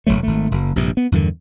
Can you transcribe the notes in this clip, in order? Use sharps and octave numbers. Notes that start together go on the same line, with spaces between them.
E1 C#2 F#3 A3
G#1 A3
F#1 F#2
A#1 G2 C3
B3
E2 G2 D3 D#3